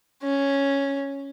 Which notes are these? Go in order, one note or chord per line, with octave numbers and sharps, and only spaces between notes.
C#4